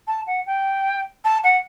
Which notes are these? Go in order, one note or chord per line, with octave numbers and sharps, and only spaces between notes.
A5
F#5
G5
A5
F#5